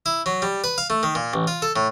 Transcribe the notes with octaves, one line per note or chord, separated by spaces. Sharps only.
E4
F#3
G3
B4
F5
A3
D#3
A#2
A1
F4
A4
A2